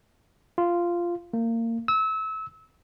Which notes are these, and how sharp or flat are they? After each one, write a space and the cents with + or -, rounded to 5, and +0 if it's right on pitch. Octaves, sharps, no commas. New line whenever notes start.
F4 -10
A#3 -25
E6 -25